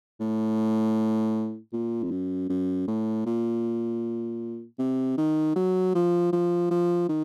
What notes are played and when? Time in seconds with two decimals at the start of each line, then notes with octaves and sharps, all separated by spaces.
0.20 A2
1.73 A#2
2.03 F2
2.11 F#2
2.49 F#2
2.87 A2
3.26 A#2
4.79 C3
5.18 D#3
5.56 F#3
5.95 F3
6.33 F3
6.70 F3
7.09 D#3